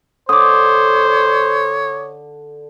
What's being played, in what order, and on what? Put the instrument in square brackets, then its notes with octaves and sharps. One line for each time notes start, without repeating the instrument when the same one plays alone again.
[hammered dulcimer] D3 [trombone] C5 [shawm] C#5 [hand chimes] D6 D#6